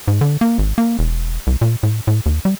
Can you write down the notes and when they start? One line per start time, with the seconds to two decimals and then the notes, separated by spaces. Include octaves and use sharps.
0.08 G#2
0.21 D3
0.41 A#3
0.58 G#1
0.78 A#3
0.99 E1
1.47 C2
1.61 A#2
1.83 A2
2.07 A2
2.26 D#2
2.45 G3